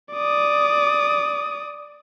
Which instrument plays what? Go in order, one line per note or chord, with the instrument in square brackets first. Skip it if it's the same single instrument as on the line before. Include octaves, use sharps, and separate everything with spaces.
[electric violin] D5 D#6